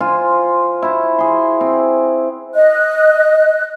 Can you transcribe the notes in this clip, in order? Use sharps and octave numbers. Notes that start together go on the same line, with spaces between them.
F4 C5 G#5
E4 F#4
G#4 C6
C4
D#5 F#6